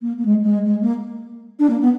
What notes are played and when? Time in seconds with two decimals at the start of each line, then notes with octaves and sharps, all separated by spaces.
0.01 A#3
0.17 A#3
0.25 G#3
0.42 G#3
0.64 G#3
0.81 A#3
1.59 D4
1.69 A#3
1.81 B3